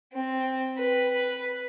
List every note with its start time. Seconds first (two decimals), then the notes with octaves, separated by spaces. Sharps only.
0.13 C4
0.78 B4